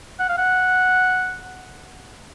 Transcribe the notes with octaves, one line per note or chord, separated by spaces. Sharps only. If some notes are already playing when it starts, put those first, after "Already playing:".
F#5
F5
F#5